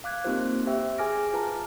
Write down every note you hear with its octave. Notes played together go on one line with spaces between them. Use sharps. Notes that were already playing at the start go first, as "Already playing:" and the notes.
F5 D6 F#6 G#6
A#3 C4 D#4 F4 G4 C5
G4 C5 E5 G5
G#4 G#5 D6 F6 A#6 D7
F4 B4 A5 A#5